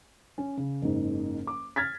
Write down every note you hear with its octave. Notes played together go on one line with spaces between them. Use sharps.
C#4
C#3
F#1 G#2
D6
F6 G#6 A6 B6